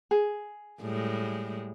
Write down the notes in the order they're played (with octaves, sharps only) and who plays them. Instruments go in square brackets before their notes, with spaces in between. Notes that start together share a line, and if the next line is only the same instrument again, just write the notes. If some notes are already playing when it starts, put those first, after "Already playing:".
[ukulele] G#4
[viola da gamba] A2 G3 G#3